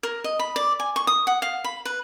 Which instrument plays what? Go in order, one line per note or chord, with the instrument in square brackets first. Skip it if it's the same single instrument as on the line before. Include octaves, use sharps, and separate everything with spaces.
[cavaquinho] A#4
D#5
B5
D5
G#5
C#6
D#6
F#5
F5
B5
B4